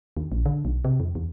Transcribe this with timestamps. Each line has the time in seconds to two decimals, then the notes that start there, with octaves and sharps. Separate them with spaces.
0.17 D#2
0.32 A#1
0.46 D3
0.65 B1
0.85 C3
1.00 F2
1.15 E2